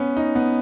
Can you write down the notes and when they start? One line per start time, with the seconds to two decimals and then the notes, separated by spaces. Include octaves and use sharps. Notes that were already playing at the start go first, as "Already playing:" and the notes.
Already playing: B3 C#4
0.17 D#4
0.35 B3